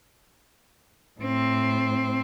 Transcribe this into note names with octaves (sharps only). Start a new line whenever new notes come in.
A2 C4